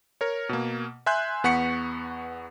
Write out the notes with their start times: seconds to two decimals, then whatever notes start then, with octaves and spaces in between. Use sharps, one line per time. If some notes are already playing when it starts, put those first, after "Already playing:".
0.21 A#4 C#5
0.49 B2 A#3
1.06 E5 G#5 C6 F#6 G6
1.44 E2 B3 F#5 C#6 B6 C#7